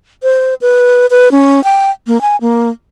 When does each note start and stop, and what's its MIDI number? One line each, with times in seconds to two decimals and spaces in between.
0.23 0.54 72
0.61 1.06 71
1.11 1.31 71
1.32 1.63 61
1.64 1.90 79
2.07 2.20 58
2.21 2.36 80
2.41 2.70 58